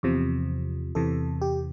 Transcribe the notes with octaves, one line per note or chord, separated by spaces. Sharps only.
E2 C3 F3
E2 C3 E3 A4
G4